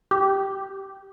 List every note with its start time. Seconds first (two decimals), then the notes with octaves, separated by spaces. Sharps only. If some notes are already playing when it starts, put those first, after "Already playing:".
0.11 G4